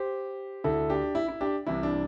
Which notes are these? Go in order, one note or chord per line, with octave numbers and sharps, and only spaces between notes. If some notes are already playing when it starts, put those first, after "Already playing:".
Already playing: G4 C5
D2 D3 E4 A4
D4 G4
E4
E4
D4 G4
C2 C3 E3 E4
D4